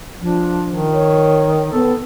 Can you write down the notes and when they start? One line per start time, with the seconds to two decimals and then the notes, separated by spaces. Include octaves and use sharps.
0.20 F3 D4
0.69 D#3
0.94 C#5
1.73 B3 A4